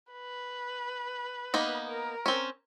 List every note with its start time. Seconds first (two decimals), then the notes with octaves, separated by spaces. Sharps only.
0.12 B4
1.54 A#3 B3 D#4
1.87 A#4
2.26 C4 C#4